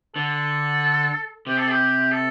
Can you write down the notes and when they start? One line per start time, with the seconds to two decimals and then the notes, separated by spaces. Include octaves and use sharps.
0.15 D3 A4
1.47 C3 G4
1.58 A4
1.71 G4
2.12 A4